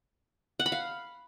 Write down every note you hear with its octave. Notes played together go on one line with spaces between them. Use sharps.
F#5
B5
F5